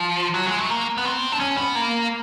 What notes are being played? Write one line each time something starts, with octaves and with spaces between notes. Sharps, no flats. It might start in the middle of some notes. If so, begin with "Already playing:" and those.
Already playing: F3
F#3
G#3
A3
A#3
B3
C4
D4
C#4
B3
A#3